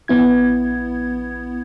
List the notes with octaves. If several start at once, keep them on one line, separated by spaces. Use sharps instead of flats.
A#1 B3 E4 G#6